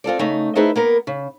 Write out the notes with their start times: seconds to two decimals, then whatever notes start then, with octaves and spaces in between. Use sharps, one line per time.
0.04 C4 F4 A4 D5
0.19 C#3 A3 D#4
0.55 A3 D#4 E4 G#4 B4 C5
0.76 A#3 B3 A#4
1.07 C#3